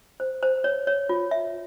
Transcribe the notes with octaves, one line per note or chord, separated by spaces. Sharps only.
C5
C5
C#5
C#5
F4
E5